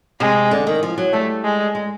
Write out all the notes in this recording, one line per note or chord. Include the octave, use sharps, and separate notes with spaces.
C3 G#3
D3
D#3
F3
F#3
G3 A3
G#3
G#3